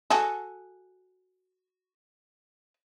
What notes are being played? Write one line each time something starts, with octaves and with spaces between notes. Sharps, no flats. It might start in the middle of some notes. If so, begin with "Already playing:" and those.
F#4 G#4 A4